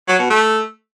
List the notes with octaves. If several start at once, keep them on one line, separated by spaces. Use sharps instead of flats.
F#3
B2
A3